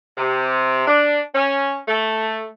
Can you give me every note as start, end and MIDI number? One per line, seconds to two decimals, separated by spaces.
0.18 0.86 48
0.87 1.21 62
1.34 1.76 61
1.88 2.47 57